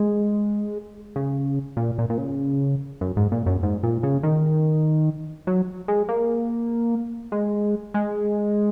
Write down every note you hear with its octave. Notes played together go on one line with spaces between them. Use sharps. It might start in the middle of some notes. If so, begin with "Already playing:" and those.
Already playing: G#3
C#3
A#2
A#2
A#2
C#3
F#2
G#2
A#2
F#2
G#2
A#2
C#3
D#3
F#3
G#3
A#3
G#3
G#3